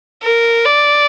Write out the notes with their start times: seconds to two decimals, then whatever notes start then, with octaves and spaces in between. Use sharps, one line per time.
0.23 A#4
0.65 D5